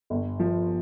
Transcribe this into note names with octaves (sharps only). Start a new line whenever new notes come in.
G1
F3